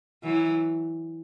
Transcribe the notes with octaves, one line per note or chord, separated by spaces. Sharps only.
E3 F#3